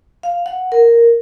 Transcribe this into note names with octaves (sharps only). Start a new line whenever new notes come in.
F5
F#5
A#4